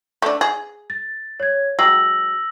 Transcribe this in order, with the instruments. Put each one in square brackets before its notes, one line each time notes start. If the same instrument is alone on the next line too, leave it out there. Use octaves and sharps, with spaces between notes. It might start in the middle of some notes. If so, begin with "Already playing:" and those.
[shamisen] A3 D4
G#4
[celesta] A6
C#5 G#6
[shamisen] F#3 G#3 G4 [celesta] E6 A#6 F#7